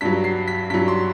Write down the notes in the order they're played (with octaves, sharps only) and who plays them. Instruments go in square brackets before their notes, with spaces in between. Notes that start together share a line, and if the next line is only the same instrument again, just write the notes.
[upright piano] G2 F#3 B6
C7
B6
G2 B6
F#3
C6